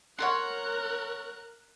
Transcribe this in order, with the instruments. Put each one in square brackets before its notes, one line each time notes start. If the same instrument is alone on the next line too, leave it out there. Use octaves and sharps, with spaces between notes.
[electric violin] A#4 F#6 [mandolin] C#5 F#5 C6